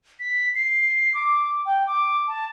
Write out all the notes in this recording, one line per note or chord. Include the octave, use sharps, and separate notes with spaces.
B6
C7
D6
G5
D6
A5